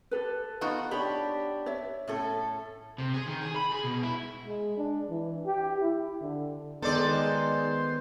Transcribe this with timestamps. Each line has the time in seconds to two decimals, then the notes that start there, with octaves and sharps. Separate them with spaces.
0.11 G4 A4 B4
0.61 B3 D#4 F4 F#4
0.91 D4 G4 C#5 B5
1.66 C#5 E5
2.08 A2 C#4 A4
2.98 C3
3.14 G#4
3.27 D#3
3.42 G#4
3.56 B5
3.72 G#4
3.83 B2
4.03 E4
4.46 G#3
4.77 D4
5.10 E3
5.46 G4
5.81 E4
6.21 D3
6.82 D#3 G#3 B3 D#4 A4 C5 D5 C6